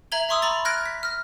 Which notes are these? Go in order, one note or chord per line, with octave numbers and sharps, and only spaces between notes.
E5 A#5 G#6 F#7 G7
E5 A#5 C6 C#6 D#6 E6
A#5 B5 C#6 A6
F6 F#6 G#6 A#6 D7
B6
F6 A#6